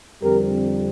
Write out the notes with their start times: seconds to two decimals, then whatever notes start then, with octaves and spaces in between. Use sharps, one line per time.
0.23 F2 D3 G3 C4 G4 A#4